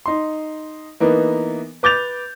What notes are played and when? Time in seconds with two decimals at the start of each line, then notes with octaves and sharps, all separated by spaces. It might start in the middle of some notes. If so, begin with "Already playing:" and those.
0.06 D#4 C6
1.00 E3 A#3 B3 D#4
1.83 B4 D6 G6 A6 F7